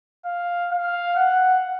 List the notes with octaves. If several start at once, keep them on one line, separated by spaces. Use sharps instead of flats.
F5
F5
F#5